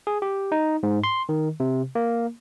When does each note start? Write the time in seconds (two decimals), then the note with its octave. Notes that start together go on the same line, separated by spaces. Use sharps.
0.07 G#4
0.22 G4
0.52 D#4
0.83 G#2
1.04 C6
1.29 D#3
1.60 C3
1.95 A#3